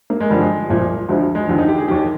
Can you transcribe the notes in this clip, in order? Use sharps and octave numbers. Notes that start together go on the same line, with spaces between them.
A#3
G#3
G2 D3 F3 G3
G#3
C2 A#2 F3
D2 D3 F3 G#3
G#3
D#2 D3 F3
D#4
G4
G#4
D#2 D#3 G4